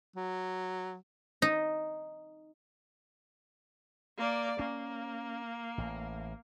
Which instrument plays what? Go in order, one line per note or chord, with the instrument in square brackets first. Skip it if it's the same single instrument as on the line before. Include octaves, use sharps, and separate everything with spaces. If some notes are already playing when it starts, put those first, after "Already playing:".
[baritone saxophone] F#3
[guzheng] D#4
[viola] A#3 D5
[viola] A#3 [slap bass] C#4
[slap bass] A1